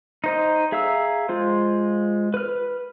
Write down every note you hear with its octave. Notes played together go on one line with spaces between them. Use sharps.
D#4 C5 D#5
G#4 E5 F5 A#5 E6
G#3 F4 C5
B4 F6